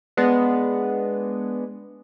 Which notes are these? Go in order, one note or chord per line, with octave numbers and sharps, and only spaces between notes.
G#3 B3 D4